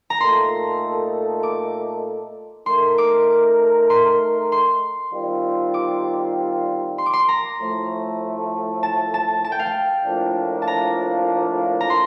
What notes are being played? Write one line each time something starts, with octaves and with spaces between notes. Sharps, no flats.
A#5
A#2 A3 D#4 A4 C6
D6
A3 D#4 A#4 C6
D6
C6
C6
D#3 G3 C4 F4
D6
C6
D6
C6
A#5
A2 F3 A3
A5
A5
A5
G5
F5
G5
A2 F3 A#3 D4 F4
A5
A#5
A#5
C6